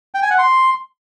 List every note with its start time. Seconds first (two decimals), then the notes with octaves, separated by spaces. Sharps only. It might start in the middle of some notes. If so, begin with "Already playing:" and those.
0.14 G5
0.22 G#5
0.30 F#5
0.38 C6